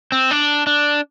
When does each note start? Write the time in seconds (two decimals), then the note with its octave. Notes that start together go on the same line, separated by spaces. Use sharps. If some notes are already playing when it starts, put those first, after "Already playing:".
0.12 C4
0.31 D4
0.67 D4